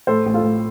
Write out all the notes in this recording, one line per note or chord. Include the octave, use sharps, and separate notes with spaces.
A2 A4 C5
A1
F4 A4
A1